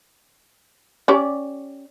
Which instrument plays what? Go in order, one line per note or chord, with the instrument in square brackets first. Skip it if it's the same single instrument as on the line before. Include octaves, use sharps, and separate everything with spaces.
[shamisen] C#4 G4 D5